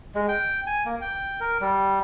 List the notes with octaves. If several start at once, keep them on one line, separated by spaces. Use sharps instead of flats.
G#3
G5
G#5
A#3
G5
A#4
G3